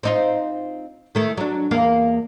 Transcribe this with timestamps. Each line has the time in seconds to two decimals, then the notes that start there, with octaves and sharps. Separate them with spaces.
0.03 C4 D#4 F4
1.15 D#3 A3 E4
1.37 F#3 D4
1.71 E2 A#3 F5